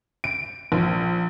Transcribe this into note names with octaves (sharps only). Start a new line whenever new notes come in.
D7
A#1